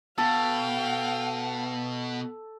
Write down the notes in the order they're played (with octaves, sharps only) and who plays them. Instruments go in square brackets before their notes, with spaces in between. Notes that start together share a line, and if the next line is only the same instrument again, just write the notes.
[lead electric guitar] B2 [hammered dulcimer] A4 [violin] F5 G5